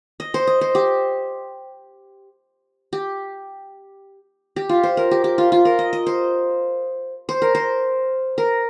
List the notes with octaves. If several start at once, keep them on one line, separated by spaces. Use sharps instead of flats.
D#5
C5
D#5
C5
G4
G4
G4
F4
C5
A#4
G4
G4
F4
F4
A#4
D#5
D#5
C5
C5
A#4
C5
A#4